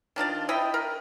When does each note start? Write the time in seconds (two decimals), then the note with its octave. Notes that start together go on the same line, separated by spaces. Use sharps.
0.16 D#3 D4 F4 D5
0.49 E4 D#5 G5 B5
0.74 A#4